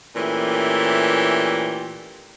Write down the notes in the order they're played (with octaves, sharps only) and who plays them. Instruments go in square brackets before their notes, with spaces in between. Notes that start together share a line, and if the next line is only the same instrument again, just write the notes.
[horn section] A#2 E3 A3 C#4 G4